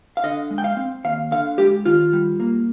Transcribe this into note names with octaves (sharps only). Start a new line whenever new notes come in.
F5
D3 D#5
G#3
G5
F5
C4
D#2 F5
D3 F5
G#3 G4
D#3 F4
G3
A#3